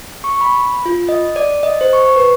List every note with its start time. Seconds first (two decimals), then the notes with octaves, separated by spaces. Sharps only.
0.24 C#6
0.41 B5
0.86 F4
1.09 D#5
1.36 D5
1.63 D#5
1.81 C5
1.93 C#6
2.16 B4